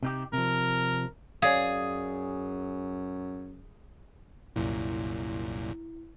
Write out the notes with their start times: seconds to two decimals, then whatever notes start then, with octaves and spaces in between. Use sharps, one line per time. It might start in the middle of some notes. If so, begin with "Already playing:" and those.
0.03 C3 D#4 G4
0.33 C3 F3 A#4
1.42 F#2 G#4 C#5 D5 F5
4.56 C2 F#2 A#2 E4